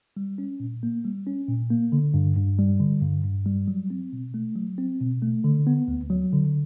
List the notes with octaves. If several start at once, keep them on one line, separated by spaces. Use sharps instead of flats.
G3
C#4
A#2
A#3
G3
C#4
A#2
A#3
D3
G2
G2
G3
D3
G2
G2
G3
F#3
C4
B2
A3
F#3
C4
B2
A3
D3
B3
D2
F#3
D3